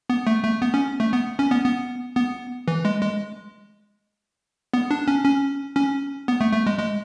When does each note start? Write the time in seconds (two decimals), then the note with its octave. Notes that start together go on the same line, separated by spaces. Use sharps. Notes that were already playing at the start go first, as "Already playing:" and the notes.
0.10 B3
0.27 A3
0.44 A3
0.62 B3
0.74 C#4
1.00 A3
1.13 B3
1.39 C#4
1.51 B3
1.65 B3
2.16 B3
2.68 E3
2.85 G#3
3.01 G#3
4.74 B3
4.91 D4
5.07 C#4
5.25 C#4
5.76 C#4
6.28 B3
6.41 A3
6.53 A3
6.66 G#3
6.79 G#3